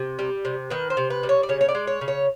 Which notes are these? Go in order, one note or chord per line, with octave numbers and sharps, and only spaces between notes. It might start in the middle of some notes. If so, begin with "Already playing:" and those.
Already playing: C3
G3
C3
D#3 B4
C5
C3
B4
G3
C#5
D5
C#3 C#5
C#5
D5
G#3
C#5
C#3
C#5